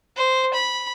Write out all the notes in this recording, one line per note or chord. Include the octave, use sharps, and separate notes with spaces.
C5
B5